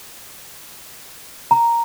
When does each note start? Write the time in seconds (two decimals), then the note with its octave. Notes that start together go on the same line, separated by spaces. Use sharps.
1.51 A#5